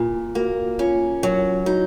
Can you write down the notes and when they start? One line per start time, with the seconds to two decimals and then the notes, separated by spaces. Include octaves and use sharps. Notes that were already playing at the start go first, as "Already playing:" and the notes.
Already playing: A#2 F4
0.35 A#3 F#4
0.79 C#4 F4
1.23 F#3
1.66 D#4 F#4